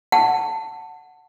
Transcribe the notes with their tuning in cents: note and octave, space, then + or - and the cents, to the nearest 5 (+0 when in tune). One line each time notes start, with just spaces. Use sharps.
F#5 +0 A5 +15